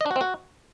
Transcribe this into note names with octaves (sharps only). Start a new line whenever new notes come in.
D#5
D4
F#4
C4
F#4